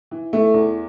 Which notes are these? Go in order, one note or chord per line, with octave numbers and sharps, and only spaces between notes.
E3
E3 A3
E2